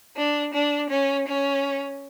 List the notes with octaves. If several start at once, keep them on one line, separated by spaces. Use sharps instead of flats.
D4
D4
C#4
C#4